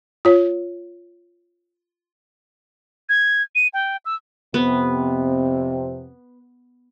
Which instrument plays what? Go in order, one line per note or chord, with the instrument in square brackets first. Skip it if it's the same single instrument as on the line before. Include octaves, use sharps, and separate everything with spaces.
[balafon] F4 C#5
[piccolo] G#6
D#7
G5
E6
[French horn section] F2 C3 C4 [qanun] B3